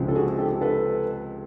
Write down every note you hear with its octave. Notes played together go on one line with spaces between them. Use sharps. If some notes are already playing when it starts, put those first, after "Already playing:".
Already playing: C#2 C3 F3 G#3
A4
F#4 G#4
G4 A4
A4 B4